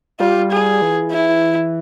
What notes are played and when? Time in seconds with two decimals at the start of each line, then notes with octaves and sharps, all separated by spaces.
0.20 G3 F4
0.52 G#4
0.82 E3
1.12 E4